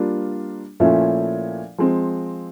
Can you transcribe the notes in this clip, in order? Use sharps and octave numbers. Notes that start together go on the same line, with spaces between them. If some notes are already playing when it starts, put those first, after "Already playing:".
Already playing: G3 A#3 D4 F4
A#2 F3 A3 C#4 E4
F3 G#3 C4